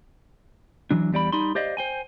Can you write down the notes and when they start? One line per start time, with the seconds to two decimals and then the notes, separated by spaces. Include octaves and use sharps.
0.91 E3 F#3 D4
1.12 E2 G3 D5 B5
1.33 G3 D#4 B5 C6
1.55 G4 C5 D5 D#5 F5
1.77 C5 G5 G#5